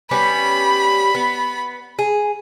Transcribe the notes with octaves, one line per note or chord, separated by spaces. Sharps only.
G3 B3 C#4 B5
B3
G#4